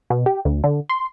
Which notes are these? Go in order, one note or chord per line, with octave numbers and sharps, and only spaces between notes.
B2
G4
D2
D3
C6